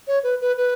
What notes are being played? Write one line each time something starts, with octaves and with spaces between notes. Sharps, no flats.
C#5
B4
B4
B4